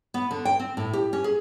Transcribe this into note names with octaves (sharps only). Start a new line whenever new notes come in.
B3
D3
G5
C4
A2
G4
C#4
G#4